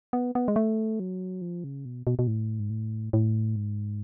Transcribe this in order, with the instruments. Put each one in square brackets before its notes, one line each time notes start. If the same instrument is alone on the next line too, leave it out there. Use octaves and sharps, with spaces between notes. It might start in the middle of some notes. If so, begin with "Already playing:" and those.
[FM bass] B3
B3
G#3
A3
F#3
F3
C#3
B2
B2
B2
A2
G#2
A2
A2
G#2